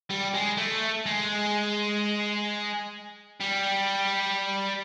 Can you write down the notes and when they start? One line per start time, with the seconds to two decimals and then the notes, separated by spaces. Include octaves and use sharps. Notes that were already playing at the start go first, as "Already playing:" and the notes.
0.10 G3
0.34 G#3
0.58 A3
1.06 G#3
3.41 G3